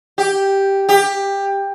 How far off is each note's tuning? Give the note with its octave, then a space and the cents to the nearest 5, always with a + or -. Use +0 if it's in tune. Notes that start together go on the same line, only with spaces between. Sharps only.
G4 +0
G4 +15